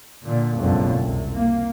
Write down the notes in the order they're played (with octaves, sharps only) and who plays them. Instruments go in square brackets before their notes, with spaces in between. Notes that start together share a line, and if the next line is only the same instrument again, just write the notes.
[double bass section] A#2 D3
F#1 B1 F2 G#2 B2 D3
C2
A#3